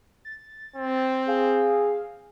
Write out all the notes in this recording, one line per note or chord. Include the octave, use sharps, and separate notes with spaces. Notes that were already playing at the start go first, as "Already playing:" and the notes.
A6
C4
G#4 F5